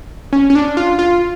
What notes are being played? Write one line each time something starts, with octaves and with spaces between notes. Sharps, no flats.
C#4
C#4
D4
F4
F4